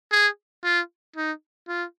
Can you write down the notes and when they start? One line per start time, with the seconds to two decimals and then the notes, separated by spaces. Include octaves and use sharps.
0.12 G#4
0.64 F4
1.16 D#4
1.68 F4